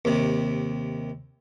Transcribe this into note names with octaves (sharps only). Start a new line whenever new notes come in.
D#2 C3